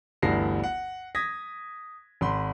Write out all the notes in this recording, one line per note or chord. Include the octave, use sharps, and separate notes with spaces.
G1 D2 E3 G3 A#6 C7
F#5
D#6 G#6 A#6 B6
G#1 B5 C6